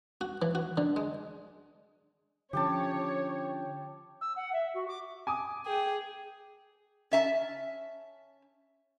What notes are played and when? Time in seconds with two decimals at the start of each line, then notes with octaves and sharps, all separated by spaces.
0.21 F#4
0.42 E3
0.55 F#4
0.77 D3
0.96 G#3
2.53 D3 F3 C#4 G4 C#5 G5 A5
4.21 E6
4.36 F#5
4.52 E5
4.74 F#4
4.87 D6
5.27 G#5 D6 D#6
5.66 G#4 G5
7.11 C#4 E5 A5